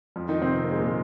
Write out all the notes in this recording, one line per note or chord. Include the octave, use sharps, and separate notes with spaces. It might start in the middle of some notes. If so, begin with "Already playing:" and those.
F2 F3
D#3 D#4
C3 C4
C4
A#3
G#3
A#2 A#3